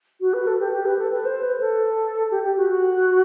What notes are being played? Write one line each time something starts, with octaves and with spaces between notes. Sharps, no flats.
F#4
B4
A4
G4
G4
B4
A4
B4
C5
B4
A4
G4
G4
F#4
F#4